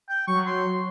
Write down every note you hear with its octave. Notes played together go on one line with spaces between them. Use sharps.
G5
F#3 C#6
C6